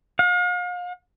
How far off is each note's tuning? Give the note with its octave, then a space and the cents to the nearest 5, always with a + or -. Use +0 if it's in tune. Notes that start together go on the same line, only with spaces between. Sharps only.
F5 +40